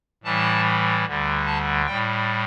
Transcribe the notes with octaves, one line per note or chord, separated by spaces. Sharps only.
A2 E3 G3 A5
D2 D3 G3
A5
A2 G3 G5